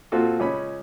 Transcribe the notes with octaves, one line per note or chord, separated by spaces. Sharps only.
A#2 C4 F4 F#4 A4
C#2 C#4 B5